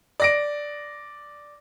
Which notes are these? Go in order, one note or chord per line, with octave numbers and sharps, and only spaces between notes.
D5 A#6 D7